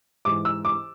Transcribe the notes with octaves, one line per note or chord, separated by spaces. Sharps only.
G#2 E3 D6
E6
D6